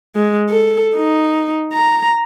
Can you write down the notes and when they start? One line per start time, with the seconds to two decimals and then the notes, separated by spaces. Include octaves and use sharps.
0.16 G#3
0.49 A4
0.95 D#4
1.73 A#5